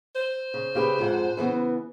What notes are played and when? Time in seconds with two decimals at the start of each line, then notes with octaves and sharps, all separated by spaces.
0.15 C5
0.54 C#3
0.75 C#3 G4 B4
0.99 F2 G#2 F#5
1.37 C#3 E3 B3